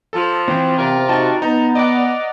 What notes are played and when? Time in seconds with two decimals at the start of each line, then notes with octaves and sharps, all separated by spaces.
0.13 F3 A4 A5
0.48 E3 C4 G5
0.78 C3 F4 A#4 D5
1.09 D#4 F#4 G4 A5 A6
1.42 B3 D#4 A#5
1.75 D5 D#5 F#5